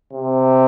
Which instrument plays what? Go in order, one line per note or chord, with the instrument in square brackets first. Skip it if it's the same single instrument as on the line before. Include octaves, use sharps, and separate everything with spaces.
[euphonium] C3